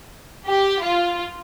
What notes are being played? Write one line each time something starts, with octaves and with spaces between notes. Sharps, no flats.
G4
F4